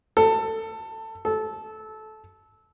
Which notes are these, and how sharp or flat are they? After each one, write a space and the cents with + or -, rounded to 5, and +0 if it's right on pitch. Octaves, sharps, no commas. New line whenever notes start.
A4 +20
A4 -20